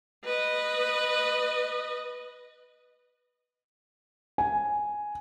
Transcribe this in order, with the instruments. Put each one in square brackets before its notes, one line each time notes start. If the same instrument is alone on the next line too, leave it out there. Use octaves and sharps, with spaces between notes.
[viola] B4 D#5
[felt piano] G#5